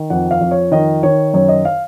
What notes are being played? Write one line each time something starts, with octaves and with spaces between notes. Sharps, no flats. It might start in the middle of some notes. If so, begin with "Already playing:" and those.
Already playing: D#3
F2 F#5
F5
F2
C#5
D#3 D#5
D#3 C#5
F#2 C#5
D#5
F5